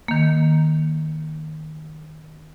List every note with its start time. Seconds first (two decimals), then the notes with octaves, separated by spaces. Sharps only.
0.08 D#3 A#3